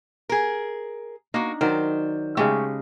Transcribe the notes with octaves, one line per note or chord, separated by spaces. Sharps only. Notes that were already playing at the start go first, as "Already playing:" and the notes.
G#4 A#4
A#3 D4 D#4 F#4
D#3 F#3 C5 D5
C#3 G#3 A3 G4